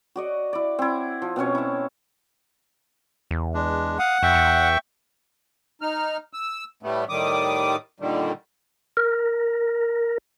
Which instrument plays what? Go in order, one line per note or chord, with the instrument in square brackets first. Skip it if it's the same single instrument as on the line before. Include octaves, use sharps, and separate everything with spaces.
[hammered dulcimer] F#4 D5 D#5
E4 D5
C4 E4
F3
B2 C4 C#4 C#5
E4 A5
[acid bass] E2
[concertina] G#3 D4
[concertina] F5 D#6 [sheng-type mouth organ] F#5
[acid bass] F2 [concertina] E5 G5 C#6
[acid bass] E2
[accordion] D#4 F6
E6
A2 G3 A3 B3
A2 D#3 G3 D6 D#6
A#2 D3 D#3 G3
[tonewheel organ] A#4